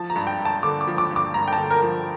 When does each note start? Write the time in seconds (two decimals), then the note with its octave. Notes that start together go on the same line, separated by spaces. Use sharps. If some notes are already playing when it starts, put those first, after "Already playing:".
Already playing: F3 A5
0.10 A#5
0.16 G2
0.27 G5
0.39 G2
0.45 A5
0.63 D3 D6
0.81 D6
0.87 F3
0.98 D6
1.11 G2
1.16 D6
1.34 G2 A#5
1.48 G5
1.53 A5
1.58 D3
1.70 A#4
1.83 F3